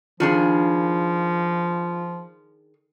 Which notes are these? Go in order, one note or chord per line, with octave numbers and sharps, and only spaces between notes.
D#3 F3 D4 F4 G#4